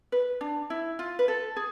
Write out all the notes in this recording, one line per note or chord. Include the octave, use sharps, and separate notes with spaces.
B4
D4
E4
F4
B4
A4
G#4